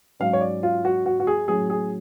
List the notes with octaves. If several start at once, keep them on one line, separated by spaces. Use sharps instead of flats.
G#2 F#3 C#4 F5
C#5
D5
F4
F#4
F#4
F#4
G#4
A2 F#3 C#4 G#4
G#4